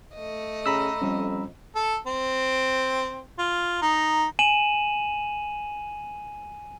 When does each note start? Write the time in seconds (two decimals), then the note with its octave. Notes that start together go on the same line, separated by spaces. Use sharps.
0.15 A3 D#5
0.66 C#3 A#5 B5 E6
1.02 F2 G3 C#4
1.76 A4
2.07 C4
3.39 F4
3.82 D#4
4.39 G#5 D#7 E7 F#7